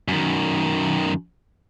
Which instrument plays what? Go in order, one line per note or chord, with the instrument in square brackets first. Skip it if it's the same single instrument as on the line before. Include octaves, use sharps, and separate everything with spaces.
[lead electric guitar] F#2 D#3